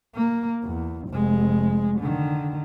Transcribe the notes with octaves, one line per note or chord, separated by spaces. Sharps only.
A#3
E2
F1 G#3
D3 D#3